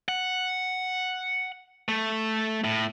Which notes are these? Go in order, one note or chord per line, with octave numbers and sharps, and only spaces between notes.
F#5
A3
A2